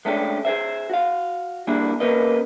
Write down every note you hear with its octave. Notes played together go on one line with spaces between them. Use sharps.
G#3 A3 C#4 D4 F#4 G4
G#4 A4 C5 E5
F#4 F5
G3 A#3 D4 E4 G#4
A#3 C#4 A#4 B4 D#5